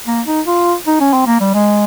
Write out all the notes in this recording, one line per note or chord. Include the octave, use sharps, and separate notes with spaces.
A#3
D#4
F4
D#4
C#4
C4
A#3
G3
G#3